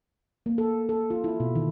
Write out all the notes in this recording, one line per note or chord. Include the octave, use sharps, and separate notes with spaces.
A#3
A4
A4
F4
E4
B2
D#3